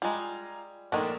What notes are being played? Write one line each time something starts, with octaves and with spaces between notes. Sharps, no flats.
G3 G#3 F4 G#5 A#5
A#1 D#3 G#3 A3 D4 A#4